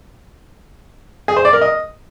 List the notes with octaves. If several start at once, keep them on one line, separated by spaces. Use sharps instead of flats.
G#4
C5
D5
A#4
D#5